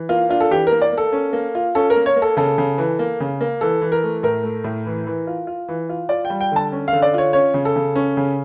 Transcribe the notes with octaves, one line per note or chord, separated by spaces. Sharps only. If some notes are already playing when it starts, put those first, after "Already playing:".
Already playing: E3
A#3 F4
D4 F4
A4
E3 G4
A#3 A#4
D5
A#3
A4
C#4
A#3
F4
C#4 A4
A#4
A#3
C#5
A#3
A4
C#3 A4
C#3
E3
A#3
C#3
A#3
E3 A4
E3
A#4
A3
A2 A#4
A3
A2
E3
E3
F4
F4
E3
F4
F4 D5
G5
G3
G5
D3 A5
C#4
F5
D3
D5
F4 C#5
C#4 C#5
C#3
A4
C#3
C#4
C#3